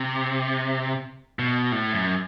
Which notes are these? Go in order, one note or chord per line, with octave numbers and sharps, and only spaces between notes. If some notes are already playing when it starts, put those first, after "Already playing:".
Already playing: C3
B2
A2
F#2